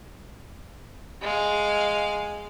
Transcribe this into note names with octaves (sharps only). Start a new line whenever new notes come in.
G#3 F5